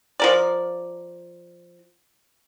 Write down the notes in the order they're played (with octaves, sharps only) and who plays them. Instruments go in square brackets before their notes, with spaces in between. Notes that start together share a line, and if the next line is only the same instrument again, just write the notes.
[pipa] F3 A#4 D5